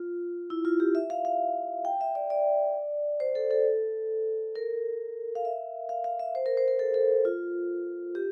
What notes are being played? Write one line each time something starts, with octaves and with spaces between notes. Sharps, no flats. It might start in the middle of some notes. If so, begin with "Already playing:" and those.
Already playing: F4
E4
F4
G4
E5
F5
F5
G5
E5
D5
D5
C5
A4
A4
A#4
F5
E5
F5
F5
E5
C5
A#4
C5
A#4
A4
A4
F4
G4